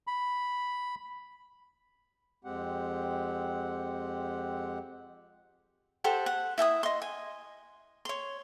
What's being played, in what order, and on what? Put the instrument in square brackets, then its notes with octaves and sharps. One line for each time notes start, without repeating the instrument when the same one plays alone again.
[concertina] B5
[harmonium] F2 G#3 C4 G4 F#5
[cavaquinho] G4 A4 C5 F#5
F#5
E4 E5 G5 D#6
D#5 C6
G#5
C#5 C6